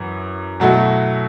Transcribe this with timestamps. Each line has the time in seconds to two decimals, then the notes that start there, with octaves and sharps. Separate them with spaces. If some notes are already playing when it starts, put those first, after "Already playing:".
Already playing: F#2 E3
0.60 B2 F#3 A3 E4